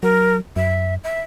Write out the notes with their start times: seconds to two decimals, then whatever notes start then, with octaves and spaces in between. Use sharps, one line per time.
0.03 F#3 A#4
0.56 F#2 E5
1.04 E5